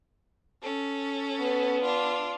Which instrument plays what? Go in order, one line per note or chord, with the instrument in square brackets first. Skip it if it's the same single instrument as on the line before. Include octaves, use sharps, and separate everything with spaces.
[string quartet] C#4 A4
[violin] B3
[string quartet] D4 F4